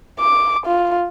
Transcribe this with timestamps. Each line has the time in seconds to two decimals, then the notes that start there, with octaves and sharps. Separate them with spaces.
0.19 D6
0.67 F4